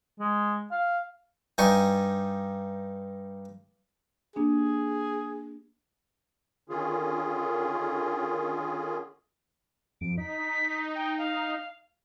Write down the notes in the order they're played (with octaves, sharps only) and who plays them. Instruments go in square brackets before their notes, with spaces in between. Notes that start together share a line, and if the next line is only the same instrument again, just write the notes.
[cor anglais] G#3
F5
[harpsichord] G2 G3 D#4 G#5 C#6
[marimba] A#3 D4 G4 [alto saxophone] G#4
[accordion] D3 D#3 C#4 F4 G#4
[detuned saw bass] F2 [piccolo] D7
[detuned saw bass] D#4 [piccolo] B6
[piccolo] G5
F5